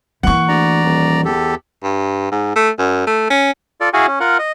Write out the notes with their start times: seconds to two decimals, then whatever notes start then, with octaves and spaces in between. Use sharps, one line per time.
0.23 E3 A#3 F#5 C#6
0.48 D2 D5 A#5
0.84 D#1
1.25 E2 G4 A4
1.83 G2
2.32 G#2
2.56 A3
2.79 F#2
3.07 A3
3.30 C#4
3.81 F4 A4 D5
3.93 E4 F#4 G#4 F5 F#5 G#5
4.07 C#4
4.20 F4 A#4 F#5
4.39 D#5